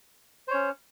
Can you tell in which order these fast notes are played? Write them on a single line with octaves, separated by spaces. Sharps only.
C5 C#5 C#4